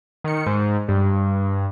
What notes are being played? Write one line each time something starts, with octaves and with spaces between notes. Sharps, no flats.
D#3 C#7
G#2
G2